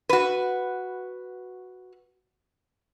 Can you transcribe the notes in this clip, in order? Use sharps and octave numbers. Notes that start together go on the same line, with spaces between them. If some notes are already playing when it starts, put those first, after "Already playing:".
F#4 B4